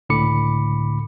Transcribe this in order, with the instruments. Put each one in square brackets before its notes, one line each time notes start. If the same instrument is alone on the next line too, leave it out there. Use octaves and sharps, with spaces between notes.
[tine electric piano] C#2 A2 D3 B5 D6 C#7